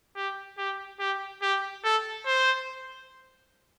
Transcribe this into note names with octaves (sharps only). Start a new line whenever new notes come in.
G4
G4
G4
G4
A4
C5